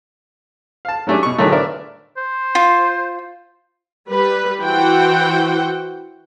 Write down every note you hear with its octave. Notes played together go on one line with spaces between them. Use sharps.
F5 A5
F#3 G3 A3 C#4 D4
B2 C#6
A2 D3 D#3 F#3 G#3 A3
D4 A#4 B4 D5 E5
C5
F4
G3 B4
E3 F#4 C5 F#5 G5